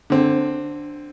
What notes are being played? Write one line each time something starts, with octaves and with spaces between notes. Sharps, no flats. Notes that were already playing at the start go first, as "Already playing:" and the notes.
D3 C4